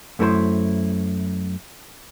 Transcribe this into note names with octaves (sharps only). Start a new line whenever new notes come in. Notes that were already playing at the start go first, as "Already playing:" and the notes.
F#2 A3 E4 A#4 C5 C6